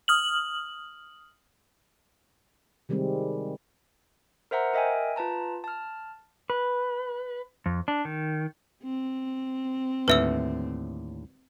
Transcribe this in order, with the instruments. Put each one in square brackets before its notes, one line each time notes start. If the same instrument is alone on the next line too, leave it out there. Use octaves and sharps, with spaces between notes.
[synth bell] D#6 F6 F#7
[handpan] C3 D#3 G3 G#3 C4
[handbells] A#4 C5 E5 F#5 A#5
A#4 D#5 E5 G5 G#5
F4 B4 A5 A#5
A5 F6
[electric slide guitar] B4
F2
D4
D#3
[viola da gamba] C4
[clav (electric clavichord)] D#2 A2 D3 [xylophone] B4 E5 E6